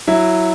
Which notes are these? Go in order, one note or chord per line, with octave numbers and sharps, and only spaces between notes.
F#3 E4